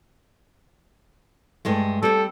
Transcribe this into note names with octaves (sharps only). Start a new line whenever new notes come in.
G2 G#3 A3
G3 C4 A4